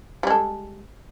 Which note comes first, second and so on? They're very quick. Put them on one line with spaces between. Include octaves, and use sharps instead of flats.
G3 G#3 A4